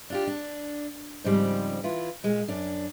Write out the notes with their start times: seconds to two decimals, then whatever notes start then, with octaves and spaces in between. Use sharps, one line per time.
0.10 D4 F4 G4
0.27 D4
1.24 G#2 C#3 F3 G3 C4
1.83 E3 E4 F4
2.24 A#2 G#3
2.48 F#2 D4